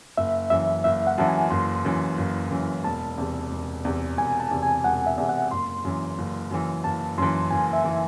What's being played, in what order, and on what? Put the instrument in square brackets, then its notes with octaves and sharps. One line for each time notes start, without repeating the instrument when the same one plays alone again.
[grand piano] F#1 [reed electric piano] E5
[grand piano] F#2 E3 [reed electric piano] E5
[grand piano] F#1 [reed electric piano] E5
[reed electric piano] F#5
[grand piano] F#2 E3 [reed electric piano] A5
[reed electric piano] G#5
[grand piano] F#1 [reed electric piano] C6
[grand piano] F#2 E3
F#1
F#2 E3
[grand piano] E1 [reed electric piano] A5
[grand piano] E2 C3
E1
E2 C3
[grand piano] E1 [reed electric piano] G#5
[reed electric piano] A5
[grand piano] E2 C3
[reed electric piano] G#5
[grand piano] E1 [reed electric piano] F#5
[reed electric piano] E5
[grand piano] E2 C3
[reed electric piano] F#5
[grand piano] F#1 [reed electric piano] C6
[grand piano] F#2 E3
F#1
F#2 E3
[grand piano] F#1 [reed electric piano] A5
[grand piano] F#2 E3 [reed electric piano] C6
[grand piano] F#1 [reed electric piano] G#5
[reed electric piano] E5
[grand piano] E3